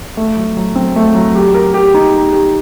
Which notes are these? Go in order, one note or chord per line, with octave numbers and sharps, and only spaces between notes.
A3
F#3
F#3
C4
A3
F#3
G4
A#4
G4
D#4
G4
G4